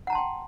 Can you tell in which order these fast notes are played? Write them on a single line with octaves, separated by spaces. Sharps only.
F#5 A#5 A5 C6 G5